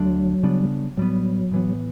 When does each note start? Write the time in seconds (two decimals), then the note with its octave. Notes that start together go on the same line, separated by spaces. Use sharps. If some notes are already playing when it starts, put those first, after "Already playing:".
Already playing: D2 D3 F#3 D4
0.43 C#3 G3 B3 D4
0.97 A2 F#3 G3 B3
1.51 A2 E3 B3